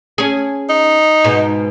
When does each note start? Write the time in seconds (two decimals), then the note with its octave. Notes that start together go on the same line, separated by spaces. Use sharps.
0.18 C#4 G#4
0.70 D#4
1.24 G#2 B2